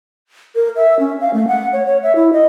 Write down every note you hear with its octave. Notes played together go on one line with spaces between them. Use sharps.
A#4
E5
C#4
F5
A3
F#5
C#5
C#5
E5
E4
D#5